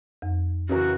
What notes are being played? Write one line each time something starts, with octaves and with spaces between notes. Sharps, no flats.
F2
C#3 E3 F#4 A#4